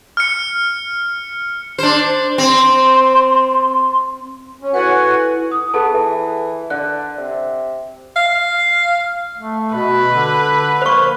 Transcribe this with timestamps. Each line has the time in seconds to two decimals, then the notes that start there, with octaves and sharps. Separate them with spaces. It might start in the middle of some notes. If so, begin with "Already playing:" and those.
0.17 F6 C#7
1.78 D4 C5
2.38 C4 C6
4.61 C#4
4.74 E4 F#4 A4 B4 F#5 G#5
5.52 D#6
5.74 B3 G#4 A4 A5
5.94 E3
6.70 D3 F#6
7.18 C3
8.16 F5
9.38 A3
9.74 B2 B4
10.09 D3
10.82 A#3 C5 C#6